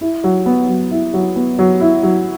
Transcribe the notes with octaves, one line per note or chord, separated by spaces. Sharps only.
E4
F#3
B3
F#3
E4
F#3
B3
F#3
E4
F#3